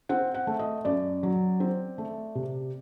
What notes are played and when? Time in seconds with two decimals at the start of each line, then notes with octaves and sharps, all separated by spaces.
0.09 C4 F#5
0.34 F#5
0.47 A3
0.59 D#5
0.85 F#2 D5
1.23 F#3
1.60 C4
1.98 A3
2.35 C3